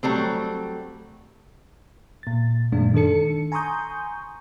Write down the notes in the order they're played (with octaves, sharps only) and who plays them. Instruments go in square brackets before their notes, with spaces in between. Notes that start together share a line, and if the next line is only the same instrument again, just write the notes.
[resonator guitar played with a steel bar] F#3 G3 A3 C4
[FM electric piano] A#2 A6
F#2 A#2 D#3 G#3 D4
D#3 D4 A4 C#7
G#5 A#5 C6 C#6 D#6 G6